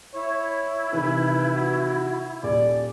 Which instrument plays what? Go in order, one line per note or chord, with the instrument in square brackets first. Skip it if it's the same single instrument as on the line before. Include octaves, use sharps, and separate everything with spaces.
[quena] E4 [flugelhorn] C#5
[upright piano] C3 D#3 E3 [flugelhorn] B4
[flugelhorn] F#4
[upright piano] D#1 [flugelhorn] D5